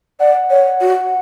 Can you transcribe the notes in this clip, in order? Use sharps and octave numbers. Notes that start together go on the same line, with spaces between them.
D5 F#5
C#5
F#4